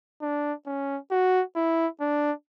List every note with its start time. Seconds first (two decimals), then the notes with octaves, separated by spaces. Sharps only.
0.22 D4
0.67 C#4
1.11 F#4
1.56 E4
2.01 D4